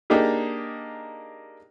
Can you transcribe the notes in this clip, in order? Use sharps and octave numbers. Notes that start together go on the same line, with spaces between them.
A#3 D4 D#4 G4 G#4